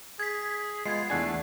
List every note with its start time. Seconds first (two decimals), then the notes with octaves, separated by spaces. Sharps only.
0.20 G#4 G#6 B6
0.86 G#3 B3 F4 G#6 C7
1.10 E2 A3 D4 F#5 G#5